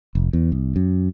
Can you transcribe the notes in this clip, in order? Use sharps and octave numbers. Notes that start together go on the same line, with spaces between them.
F1
E2
C2
F#2